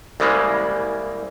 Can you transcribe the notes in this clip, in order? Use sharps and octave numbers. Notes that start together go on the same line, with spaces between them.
C2 C#3 E3 G3 G#3 A#3